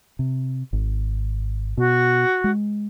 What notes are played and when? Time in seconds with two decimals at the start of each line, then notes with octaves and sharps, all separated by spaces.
0.19 C3
0.73 G#1
1.77 B2 F#4
2.44 G#3